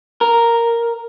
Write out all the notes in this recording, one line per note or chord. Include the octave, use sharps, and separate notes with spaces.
A#4